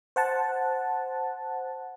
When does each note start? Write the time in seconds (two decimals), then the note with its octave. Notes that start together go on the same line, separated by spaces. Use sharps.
0.16 C5 F#5 A5